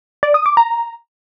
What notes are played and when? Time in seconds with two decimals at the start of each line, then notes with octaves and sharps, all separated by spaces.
0.23 D5
0.34 D#6
0.46 D6
0.57 A#5